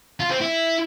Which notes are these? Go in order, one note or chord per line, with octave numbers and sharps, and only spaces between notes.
F4
C4
E4